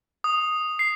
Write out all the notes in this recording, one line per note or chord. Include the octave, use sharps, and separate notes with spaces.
D#6
C7